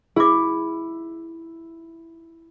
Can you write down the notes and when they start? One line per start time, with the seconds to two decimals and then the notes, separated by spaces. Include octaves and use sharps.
0.16 E4 G#4 D6